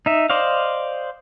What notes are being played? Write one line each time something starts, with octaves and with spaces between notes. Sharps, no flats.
D#4 E5
C5 D5 D#5 F5